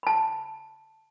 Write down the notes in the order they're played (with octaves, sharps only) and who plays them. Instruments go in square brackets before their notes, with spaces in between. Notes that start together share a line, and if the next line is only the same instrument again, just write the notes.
[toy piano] A5 B5